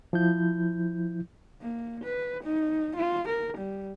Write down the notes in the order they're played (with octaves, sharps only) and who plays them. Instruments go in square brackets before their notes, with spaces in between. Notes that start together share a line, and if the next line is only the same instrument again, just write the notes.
[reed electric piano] F3 E4 G6
[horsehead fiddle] A#3
B4
D#4
F4
A#4
G3